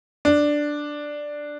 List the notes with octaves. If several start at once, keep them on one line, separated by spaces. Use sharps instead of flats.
D4